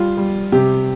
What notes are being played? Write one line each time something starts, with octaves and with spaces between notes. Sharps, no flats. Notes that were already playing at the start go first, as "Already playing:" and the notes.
Already playing: G3 F4
G3
C3 G4